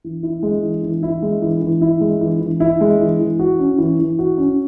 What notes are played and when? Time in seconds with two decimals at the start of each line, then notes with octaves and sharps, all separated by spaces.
0.04 E3
0.23 E4
0.43 G#3
0.63 E3
0.83 E3
1.03 E4
1.22 G#3
1.42 E3
1.62 E3
1.81 E4
2.01 G#3
2.21 E3
2.41 E3
2.60 E4
2.81 G#3
3.01 E3
3.19 E3
3.39 F#4
3.59 C#4
3.78 E3
3.99 E3
4.19 F#4
4.38 C#4